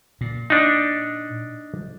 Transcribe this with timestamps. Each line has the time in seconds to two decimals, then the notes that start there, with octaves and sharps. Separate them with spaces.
0.21 A#2
0.50 D4 D#4